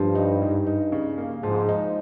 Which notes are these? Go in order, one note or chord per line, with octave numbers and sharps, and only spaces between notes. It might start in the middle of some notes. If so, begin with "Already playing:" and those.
Already playing: G2 F3
D#4
G#2
D#4
C#3
A#3
G#2 F3
D#4